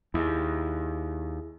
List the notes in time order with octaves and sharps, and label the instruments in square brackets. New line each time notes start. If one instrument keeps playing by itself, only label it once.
[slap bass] D#2 [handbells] E4 G#4